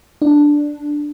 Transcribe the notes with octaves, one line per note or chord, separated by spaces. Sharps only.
D4